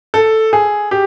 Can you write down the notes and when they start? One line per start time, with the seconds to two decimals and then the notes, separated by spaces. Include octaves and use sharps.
0.14 A4
0.53 G#4
0.91 G4